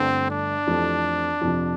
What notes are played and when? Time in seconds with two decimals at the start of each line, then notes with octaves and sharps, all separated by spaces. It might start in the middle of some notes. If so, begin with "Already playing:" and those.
Already playing: G1 G2 D3 A3 C4
0.30 D4
0.67 F2 E3 A3 C4 G4
1.41 F2 C3 F3